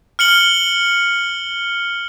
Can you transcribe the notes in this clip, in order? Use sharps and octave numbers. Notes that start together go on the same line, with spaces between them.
F6 C#7 F#7 G7